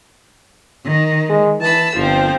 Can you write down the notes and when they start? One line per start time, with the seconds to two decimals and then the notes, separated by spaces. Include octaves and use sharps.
0.83 D#3
1.29 G#3
1.60 E3 A5 B5 E6
1.95 G1 F3 C4